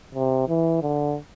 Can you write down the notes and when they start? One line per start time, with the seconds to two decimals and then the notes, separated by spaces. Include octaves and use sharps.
0.15 C3
0.48 E3
0.82 D3